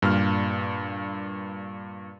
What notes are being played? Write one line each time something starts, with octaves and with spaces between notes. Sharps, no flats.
G2 A#2 F6